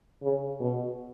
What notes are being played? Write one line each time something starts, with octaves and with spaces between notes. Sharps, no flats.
C#3
B2